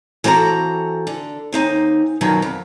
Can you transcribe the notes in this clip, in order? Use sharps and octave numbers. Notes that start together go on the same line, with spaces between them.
E3 C4 F#4 A4 A#5
D3
D#2 C4 D#4 G#5
F#2 B2 D3 D#3 F3 F#3
F2